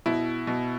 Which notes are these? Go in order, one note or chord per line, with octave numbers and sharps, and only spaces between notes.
B2 E4
B2